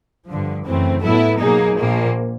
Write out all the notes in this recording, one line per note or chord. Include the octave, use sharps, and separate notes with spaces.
G2 D3 F3
F#2 C#3 E3 A3 C4
A2 F#3 B3 E4 A4
B2 F#3 A#3 D#4 G#4
A#1 A#2 F3 A#3